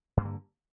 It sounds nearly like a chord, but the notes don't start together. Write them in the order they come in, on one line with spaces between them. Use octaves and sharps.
G2 A#3 D3